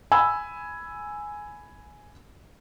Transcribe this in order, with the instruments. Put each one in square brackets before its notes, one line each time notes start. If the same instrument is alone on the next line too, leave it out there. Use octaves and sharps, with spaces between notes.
[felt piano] G#5 B5 E6